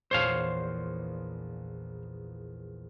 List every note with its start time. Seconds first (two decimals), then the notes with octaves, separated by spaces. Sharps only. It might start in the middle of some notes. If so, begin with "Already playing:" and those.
0.11 A#1 E2 A#2 C5 C#5 F5